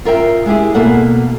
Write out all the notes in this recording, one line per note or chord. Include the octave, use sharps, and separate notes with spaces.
F4 A#4 E5 G5
G#3 E4 G4 G#4
B2 A#3 A4 F#5